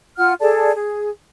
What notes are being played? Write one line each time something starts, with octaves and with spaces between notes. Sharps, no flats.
F4 F#5 F6
G#4 A4 D5 A5
G#4